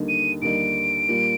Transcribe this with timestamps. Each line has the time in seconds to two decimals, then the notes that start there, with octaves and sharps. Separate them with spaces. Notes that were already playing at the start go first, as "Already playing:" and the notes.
Already playing: D#2 D3 G3 A#3 D#4
0.09 D#7
0.41 D#2 D3 G3 A#3 D#4 D7
1.08 A#2 G3 A#3 F4